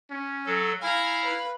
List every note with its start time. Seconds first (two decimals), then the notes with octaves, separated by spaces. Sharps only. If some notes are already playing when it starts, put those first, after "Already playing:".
0.10 C#4
0.46 F#3 A4
0.82 E4 F5 G#5 A#5
1.24 B4